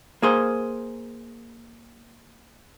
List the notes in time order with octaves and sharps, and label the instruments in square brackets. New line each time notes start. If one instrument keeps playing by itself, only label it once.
[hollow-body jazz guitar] A#3 G#4 C5